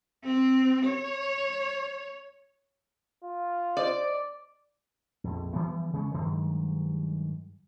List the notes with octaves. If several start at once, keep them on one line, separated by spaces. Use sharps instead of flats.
C4
C#5
F4
C5 D5 D#5
A#1 F2
E3 F3 G3 B3
C#3 G#3 A#3 C#4
G2 D#3 F#3 G#3